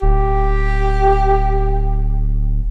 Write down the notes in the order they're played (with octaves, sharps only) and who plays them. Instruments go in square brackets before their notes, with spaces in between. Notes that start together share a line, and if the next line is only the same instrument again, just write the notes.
[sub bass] D1 [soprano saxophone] G4